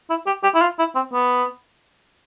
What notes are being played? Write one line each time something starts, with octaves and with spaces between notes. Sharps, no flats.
E4
G4
G4
E4
F4
E4
C4
B3